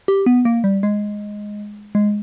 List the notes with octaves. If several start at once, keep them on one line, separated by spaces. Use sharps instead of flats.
G4
B3
A#3
G3
G#3
G#3